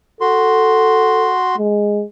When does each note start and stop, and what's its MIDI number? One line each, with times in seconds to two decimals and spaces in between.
0.21 1.56 66
0.21 1.34 69
0.21 1.56 84
1.58 2.03 56